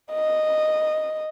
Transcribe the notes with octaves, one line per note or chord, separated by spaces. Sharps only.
D#5